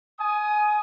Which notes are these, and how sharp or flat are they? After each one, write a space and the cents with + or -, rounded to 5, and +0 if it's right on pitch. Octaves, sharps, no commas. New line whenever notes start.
G#5 +20 D#6 +0